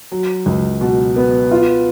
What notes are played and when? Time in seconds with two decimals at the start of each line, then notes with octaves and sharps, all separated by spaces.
0.12 F#3
0.46 C#2
0.81 B2
1.16 B3
1.51 F4